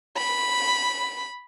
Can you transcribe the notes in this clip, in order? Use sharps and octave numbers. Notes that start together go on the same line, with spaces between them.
B5